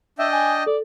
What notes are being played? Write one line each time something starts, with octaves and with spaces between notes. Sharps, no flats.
D4 D#5 E5 G5
G#5
D#6
A4 D5